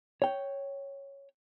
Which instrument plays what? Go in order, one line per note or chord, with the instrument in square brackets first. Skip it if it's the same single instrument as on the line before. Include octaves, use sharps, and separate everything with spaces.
[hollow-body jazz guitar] C#5 G5